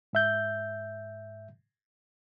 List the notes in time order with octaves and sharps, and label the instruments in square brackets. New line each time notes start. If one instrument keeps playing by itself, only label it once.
[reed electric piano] G#2 E5 G6